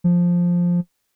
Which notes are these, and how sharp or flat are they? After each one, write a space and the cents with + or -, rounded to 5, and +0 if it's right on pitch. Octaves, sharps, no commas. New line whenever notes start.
F3 +5